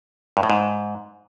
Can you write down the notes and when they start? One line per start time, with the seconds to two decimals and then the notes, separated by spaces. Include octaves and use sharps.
0.37 G2
0.43 A2
0.50 G#2